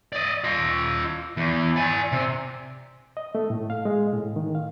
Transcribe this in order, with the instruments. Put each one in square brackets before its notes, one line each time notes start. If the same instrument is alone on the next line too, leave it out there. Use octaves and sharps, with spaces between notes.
[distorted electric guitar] D5 D#5
F4 D#5
E2
D5 G#5
C3
[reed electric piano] D#5
A3
A2
F5
G#3
A2
D#3
F5